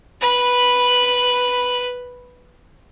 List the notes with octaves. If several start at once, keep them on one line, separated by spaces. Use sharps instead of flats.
B4 B5